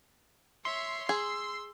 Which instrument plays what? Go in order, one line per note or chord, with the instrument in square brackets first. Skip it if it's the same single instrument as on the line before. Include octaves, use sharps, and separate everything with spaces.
[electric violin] C#5 E5 [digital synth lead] C6
[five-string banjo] G#4 [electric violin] E6